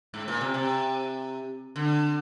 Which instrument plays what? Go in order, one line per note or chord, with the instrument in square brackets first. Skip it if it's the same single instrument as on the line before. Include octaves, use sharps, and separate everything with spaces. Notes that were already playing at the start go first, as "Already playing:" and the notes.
[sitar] G#2
A#2
C3
C3
D3